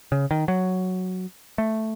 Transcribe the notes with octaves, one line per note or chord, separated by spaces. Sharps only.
C#3
D#3
F#3
A3